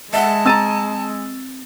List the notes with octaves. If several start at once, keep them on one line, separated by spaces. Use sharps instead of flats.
G#3 E5 F#5 A5
C4 A#5 E6 A6 D#7